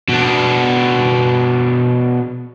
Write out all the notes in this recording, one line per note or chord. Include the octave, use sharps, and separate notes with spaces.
B2 D4